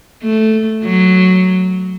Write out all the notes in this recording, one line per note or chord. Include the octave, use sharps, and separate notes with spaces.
A3
F#3